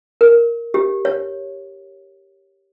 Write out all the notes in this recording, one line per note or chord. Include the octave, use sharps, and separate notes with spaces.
A#4
G4
C#5